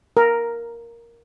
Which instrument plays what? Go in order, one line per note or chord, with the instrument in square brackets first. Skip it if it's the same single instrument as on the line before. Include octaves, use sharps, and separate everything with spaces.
[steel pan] A#4